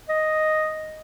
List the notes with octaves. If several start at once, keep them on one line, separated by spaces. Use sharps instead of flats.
D#5